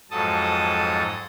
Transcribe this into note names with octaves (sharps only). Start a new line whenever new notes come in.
F2 G#2 F#3 A4 A5 D#6